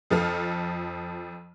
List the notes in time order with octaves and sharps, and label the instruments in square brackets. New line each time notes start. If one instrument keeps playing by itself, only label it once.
[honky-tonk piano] F2 F3 A4 F6